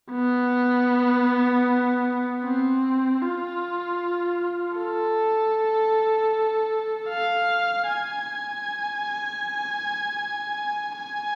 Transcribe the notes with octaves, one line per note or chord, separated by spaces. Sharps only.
B3
C4
F4
A4
F5
G#5
G#5